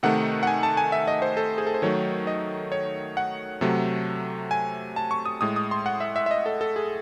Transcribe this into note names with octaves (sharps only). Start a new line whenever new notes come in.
C3 D#3 A3 F#5
F#5
G#5
A5
G#5
E5
D#5
C5
A4
G#4
A4
C5
D#3 F#3 A3 C#5
D#5
C#5
F#5
C3 F#3 A3
G#5
A5
C#6
D#6
A2 G#3 D#6
D#6
C6
F#5
E5
E5
E5
D#5
A4
A4
G#4